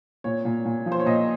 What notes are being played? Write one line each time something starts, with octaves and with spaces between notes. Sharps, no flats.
A#2 C#5
A#2
A#2
F3
C5
C#5
A#2 D#5